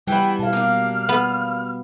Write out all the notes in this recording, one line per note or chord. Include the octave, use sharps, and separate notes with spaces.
E3 G3 B3 E4 G5
B2 F5 A5
A#3 D4 F6
B3